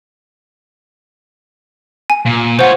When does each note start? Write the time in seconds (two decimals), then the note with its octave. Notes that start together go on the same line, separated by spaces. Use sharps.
2.10 G#5
2.25 A#2
2.59 F4 C5 C#5 F#5